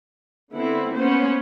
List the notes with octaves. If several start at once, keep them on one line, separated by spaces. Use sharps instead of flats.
D3 B3 C4 E4
A#3 B3 C#4 C5